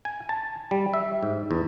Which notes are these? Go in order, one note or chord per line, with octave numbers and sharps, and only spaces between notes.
G#5
A5
G3
E5
G#2
E2